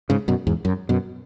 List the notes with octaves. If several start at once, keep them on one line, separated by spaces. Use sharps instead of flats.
G#2 C#3
F#2 B2
E2 G#2
F#2
F#2 B2